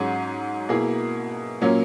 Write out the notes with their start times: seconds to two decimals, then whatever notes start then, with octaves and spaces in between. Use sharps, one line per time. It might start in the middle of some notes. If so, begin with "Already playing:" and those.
Already playing: G#2 F#3 C#4 G#4
0.69 B2 A#3 E4 G#4
1.61 A#2 F#3 A#3 C#4